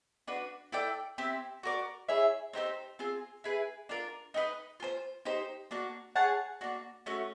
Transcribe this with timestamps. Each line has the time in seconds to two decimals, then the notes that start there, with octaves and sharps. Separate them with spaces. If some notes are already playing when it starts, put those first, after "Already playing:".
0.27 D4 F#4 B4
0.72 E4 A4 D5 G5
1.18 C4 E4 G4
1.63 F#4 A#4 D5
2.08 E4 G#4 C#5 E5
2.53 C4 D#4 G4 C5
2.99 C4 F4 G#4
3.44 E4 G#4 B4
3.89 D4 F4 A#4
4.34 D#4 F#4 B4 D#5
4.80 F4 A4 C5
5.25 D#4 G4 C5
5.71 A#3 D4 F#4
6.15 G#4 C#5 F#5 A5
6.61 A#3 D4 F#4
7.06 A3 C#4 F#4